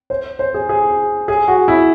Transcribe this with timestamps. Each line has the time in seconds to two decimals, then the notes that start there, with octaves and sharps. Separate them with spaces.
0.10 C5
0.39 C5
0.54 G#4
0.69 G#4
1.28 G#4
1.48 F#4
1.68 E4